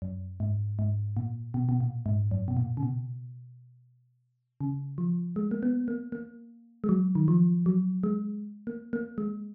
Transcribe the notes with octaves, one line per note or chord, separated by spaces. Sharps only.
F#2
G#2
G#2
A#2
B2
B2
A#2
G#2
F#2
B2
A#2
C#3
B2
C#3
F3
G#3
A#3
B3
A#3
A#3
G#3
F#3
D#3
F3
F#3
G#3
A#3
A#3
G#3